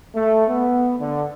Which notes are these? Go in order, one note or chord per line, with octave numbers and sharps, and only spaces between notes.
A3
B3
D3